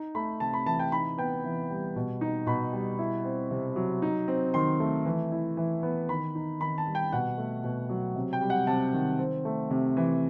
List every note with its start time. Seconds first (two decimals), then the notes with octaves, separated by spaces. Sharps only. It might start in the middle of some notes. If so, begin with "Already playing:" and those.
Already playing: D#4
0.15 A3 B5
0.40 C3 A5
0.53 B5
0.66 E3 A5
0.79 G5
0.92 D#4 B5
1.18 B3 G5
1.44 E3
1.70 G3
1.96 B2
2.21 D#4
2.47 B2 B5
2.73 G3
2.99 E4
3.25 C4
3.51 C3
3.76 F#3
4.02 D#4
4.28 C4
4.54 D#3 C6
4.80 A3
5.06 E3
5.32 E4
5.57 E3
5.83 B3
6.09 D#3 B5
6.35 D#4
6.60 D#3 B5
6.78 A5
6.86 G3
6.95 G5
7.12 B2 F#5
7.38 A3
7.64 B2
7.89 F#3
8.15 C3
8.33 G5
8.41 G3
8.50 F#5
8.67 C3 A5
8.93 D#3
9.19 C4
9.45 A3
9.70 C3
9.97 E3